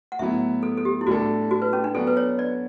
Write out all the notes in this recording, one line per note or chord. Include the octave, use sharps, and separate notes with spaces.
F#5
A2 F#3 B3 E4 E5
A4
A4
G4
E4
A2 G3 D4 F#4 A4
F#4
B4
C#4
D4
F#3 B3 D4 F#4 A4
B4
C#5
D5